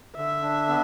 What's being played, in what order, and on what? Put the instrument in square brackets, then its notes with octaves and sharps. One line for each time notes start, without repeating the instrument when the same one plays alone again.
[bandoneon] D3 [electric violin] E5
[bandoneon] D4
B3